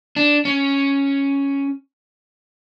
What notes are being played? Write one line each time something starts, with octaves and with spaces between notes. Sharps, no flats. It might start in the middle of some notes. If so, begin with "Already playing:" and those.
D4
C#4